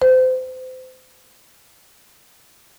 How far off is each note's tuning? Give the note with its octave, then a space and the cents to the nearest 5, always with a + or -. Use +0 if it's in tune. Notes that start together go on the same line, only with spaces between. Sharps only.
C5 -30